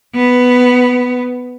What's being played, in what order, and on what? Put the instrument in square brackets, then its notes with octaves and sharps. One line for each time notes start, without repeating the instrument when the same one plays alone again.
[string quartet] B3